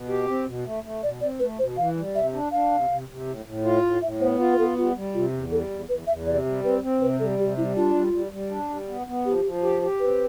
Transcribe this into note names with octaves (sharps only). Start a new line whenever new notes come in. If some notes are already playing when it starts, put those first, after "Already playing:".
Already playing: B2
G4
C4
B2
A3
A3
B2 D5
C4 D5
A3 B4
B2 C5
E3 F5
G3
C3 E5
D4
D4 F5
C3
C3
C3
A2
A2
F4
A2
A2 E5
B3 C5
F4
B4
B3 A4
G3 F4
G3
C3 F4
E2
G3 A4
E2
E2 B4
E2 E5
C3 D5
G3
C4 B4
C4
C3 B4
G3 A4
C3 G4
G3 E4
D4 F4
G3
G3
G3
D4
G3
B3
B3
F3 G4
F3
G4
G4
C4 B4